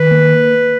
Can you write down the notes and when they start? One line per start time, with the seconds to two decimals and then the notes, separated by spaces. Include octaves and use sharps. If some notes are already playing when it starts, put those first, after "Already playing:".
Already playing: D#3 B4
0.11 A#3